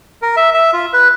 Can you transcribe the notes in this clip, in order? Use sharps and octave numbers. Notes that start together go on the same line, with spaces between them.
A#4
E5
E5
F4
B4